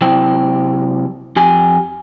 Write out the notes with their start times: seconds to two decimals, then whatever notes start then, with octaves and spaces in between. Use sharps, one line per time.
0.01 C3 F#3 E4 C5 G5
1.36 F2 G4 G#5